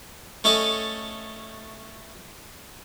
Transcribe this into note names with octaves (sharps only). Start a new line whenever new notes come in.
A3 C#4 A4 D#5 A5